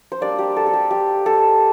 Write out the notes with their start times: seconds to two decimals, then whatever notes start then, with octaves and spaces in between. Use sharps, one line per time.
0.12 C5
0.21 G3 A#3 D4 D5
0.39 G4
0.56 A4
0.67 A4
0.74 G4
0.91 G4
1.26 A4